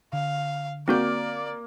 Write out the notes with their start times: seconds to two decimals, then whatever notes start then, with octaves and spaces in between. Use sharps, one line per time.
0.13 D3 F5
0.88 A#3 C4 F#4 D5 G6